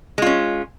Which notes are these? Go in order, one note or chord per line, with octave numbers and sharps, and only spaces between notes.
G#3 C#4 F4